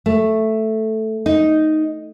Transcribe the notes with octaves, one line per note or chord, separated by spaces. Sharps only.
A3
D#4